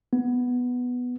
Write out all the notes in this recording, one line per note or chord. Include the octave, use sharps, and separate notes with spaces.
B3